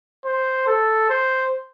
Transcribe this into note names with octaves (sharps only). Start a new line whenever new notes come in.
C5
A4
C5